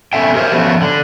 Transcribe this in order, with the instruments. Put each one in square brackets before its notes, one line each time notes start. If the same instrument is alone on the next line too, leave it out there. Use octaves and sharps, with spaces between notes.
[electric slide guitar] B3 C#4 A4 E5 G5
G4 A#4 C5 C#5 E5
F3 A3 B3 C#4 F#4
D3